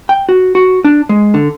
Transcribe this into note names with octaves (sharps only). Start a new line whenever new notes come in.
G5
F#4
F#4
D4
G#3
D3